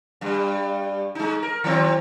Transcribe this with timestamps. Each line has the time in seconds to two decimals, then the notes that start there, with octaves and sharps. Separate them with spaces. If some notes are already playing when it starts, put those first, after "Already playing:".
0.21 G2 G3
1.15 G#3 D#4
1.43 A#4
1.64 D#3 F#3 C4